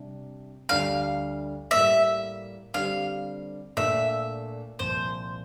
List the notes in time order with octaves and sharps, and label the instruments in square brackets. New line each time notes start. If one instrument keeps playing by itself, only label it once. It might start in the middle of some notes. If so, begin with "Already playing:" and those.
Already playing: [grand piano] C3 G3 D4
[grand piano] D2 D3 G3 D4 F4 [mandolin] F5
[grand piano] A2 G3 A#3 [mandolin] E5
[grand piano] D3 G3 C4 G4 [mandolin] F5
[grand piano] A#2 A3 D4 F4 [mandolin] E5
[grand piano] C2 A#2 F3 [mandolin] C5